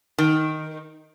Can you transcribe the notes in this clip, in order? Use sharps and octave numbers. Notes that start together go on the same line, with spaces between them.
D#3